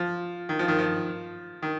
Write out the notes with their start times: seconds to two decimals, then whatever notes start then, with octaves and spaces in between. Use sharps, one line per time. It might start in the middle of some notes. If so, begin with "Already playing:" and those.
Already playing: F3
0.49 D#3
0.59 F3
0.68 D#3
0.79 F3
1.62 D#3